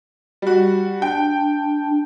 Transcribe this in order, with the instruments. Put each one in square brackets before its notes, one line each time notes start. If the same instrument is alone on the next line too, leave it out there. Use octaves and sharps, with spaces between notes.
[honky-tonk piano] G3 F#4
[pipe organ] D4 [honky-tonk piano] G5